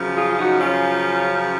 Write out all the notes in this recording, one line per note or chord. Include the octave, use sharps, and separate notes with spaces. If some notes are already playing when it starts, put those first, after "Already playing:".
Already playing: F#2 C#3 F3
F4 G#4
F4
D#4 F#4
C#4 F4